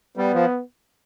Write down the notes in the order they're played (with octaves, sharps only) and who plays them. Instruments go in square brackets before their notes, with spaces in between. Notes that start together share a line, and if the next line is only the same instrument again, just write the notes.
[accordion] G3 [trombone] B3
[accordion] F3